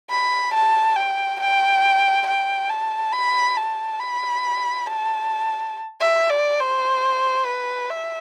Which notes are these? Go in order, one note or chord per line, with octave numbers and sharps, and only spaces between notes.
B5
A5
G5
G5
G5
A5
B5
A5
B5
A5
E5
D5
C5
B4
E5